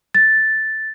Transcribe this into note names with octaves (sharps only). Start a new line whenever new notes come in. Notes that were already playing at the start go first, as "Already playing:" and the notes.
A6